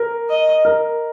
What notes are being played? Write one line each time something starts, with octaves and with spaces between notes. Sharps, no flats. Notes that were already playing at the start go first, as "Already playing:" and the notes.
Already playing: A#4
D#5
A#4